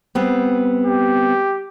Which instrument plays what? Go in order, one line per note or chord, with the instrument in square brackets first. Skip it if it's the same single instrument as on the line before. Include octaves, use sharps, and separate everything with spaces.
[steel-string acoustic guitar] G3 B3 C4
[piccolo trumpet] G4